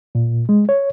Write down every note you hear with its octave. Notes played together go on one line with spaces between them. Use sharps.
A#2
G#3
C#5